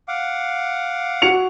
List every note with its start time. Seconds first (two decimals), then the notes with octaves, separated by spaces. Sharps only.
0.08 F5 F#5 D6
1.22 F#4 C#7 F7